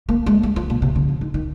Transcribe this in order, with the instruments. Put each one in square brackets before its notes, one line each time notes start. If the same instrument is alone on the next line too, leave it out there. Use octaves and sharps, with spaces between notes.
[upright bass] A#3
G#3
G#3
F3
A#2
C3
C#3
F3
D#3
D#3